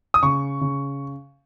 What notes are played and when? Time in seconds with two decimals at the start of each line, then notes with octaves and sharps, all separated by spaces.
0.14 D#6
0.23 C#3 C#6
0.61 C#3